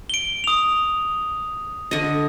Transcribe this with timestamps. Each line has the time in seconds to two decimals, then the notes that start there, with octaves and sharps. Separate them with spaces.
0.10 D7 G7
0.44 D#6 F7
1.91 D3 D#5